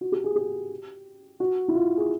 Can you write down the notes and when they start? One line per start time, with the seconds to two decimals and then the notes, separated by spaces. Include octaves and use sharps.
0.01 F#4
0.12 G4
0.24 G#4
0.36 G4
1.40 F#4
1.68 E4
1.75 F4
1.97 G#4